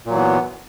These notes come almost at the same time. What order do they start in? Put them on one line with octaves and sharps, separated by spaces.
A#2 F#3 E3 B3